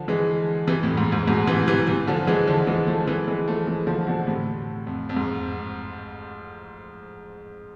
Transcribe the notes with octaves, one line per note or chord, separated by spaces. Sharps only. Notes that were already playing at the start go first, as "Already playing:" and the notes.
Already playing: D3 F3
E3 G#3
C3 E3
F2 A2
G#2
G#2
G#2 B2
C3 E3
C3 E3
C3 E3
D3 F3
E3 G#3
D3 F3
E3 G#3
F3 A3
E3 G#3
E3 G#3
F3 A3
E3 G#3
D3 F3
B2 D3
A2 C3
F2
F2
G#2